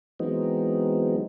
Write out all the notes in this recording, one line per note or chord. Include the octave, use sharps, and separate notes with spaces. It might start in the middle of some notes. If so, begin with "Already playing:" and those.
E3 F#3 G#3 B3 C4 D#4